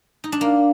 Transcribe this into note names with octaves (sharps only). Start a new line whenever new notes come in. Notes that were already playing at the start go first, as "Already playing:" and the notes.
D#4
D4
A#3